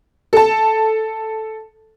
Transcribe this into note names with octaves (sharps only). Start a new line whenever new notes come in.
A4 A5